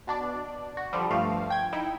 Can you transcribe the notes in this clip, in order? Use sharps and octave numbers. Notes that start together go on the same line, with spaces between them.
B2 D4 D5
F#4
D3 F3 G3
G2 F3 A3 F5
G5 G#6
D#4 E4 G5